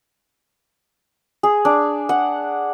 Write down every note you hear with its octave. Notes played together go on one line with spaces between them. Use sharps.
G#4
D4
F#5